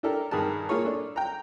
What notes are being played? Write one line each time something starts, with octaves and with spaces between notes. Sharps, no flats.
D4 E4 G4 A4 A#4
G2 D#3 G#4 A#4 A5
A#3 F4 G#4 C#5
D4 A4
G5 A#5